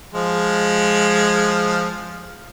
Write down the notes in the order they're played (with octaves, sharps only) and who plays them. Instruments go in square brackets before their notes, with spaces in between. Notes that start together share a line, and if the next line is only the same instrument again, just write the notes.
[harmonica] F3 G#3